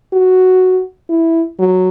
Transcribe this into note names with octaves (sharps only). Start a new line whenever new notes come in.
F#4
E4
F#3